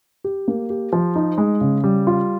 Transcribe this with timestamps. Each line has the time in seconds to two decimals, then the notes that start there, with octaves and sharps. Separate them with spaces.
0.24 G4
0.48 A#3
0.70 G4
0.93 F3
1.16 D#4
1.38 G#3
1.61 C#3
1.84 G3
2.07 F4